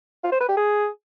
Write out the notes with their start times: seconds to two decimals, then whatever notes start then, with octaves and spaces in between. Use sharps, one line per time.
0.24 F4
0.32 C5
0.40 B4
0.49 G4
0.57 G#4